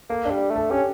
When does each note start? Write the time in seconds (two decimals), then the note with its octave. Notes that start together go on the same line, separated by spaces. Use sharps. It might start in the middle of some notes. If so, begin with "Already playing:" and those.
0.09 A#3 A4
0.25 D4
0.30 G3
0.50 A3
0.56 A4
0.71 C#4 G4